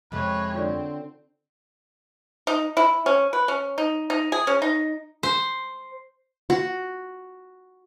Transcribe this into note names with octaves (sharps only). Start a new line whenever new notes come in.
F2 C3 G#3 B4 C#5
D3 C4 F4 C#5 D5
D#4
E4
C#4
B4
C#4
D#4
D#4
G#4
C#4
D#4
C5
F#4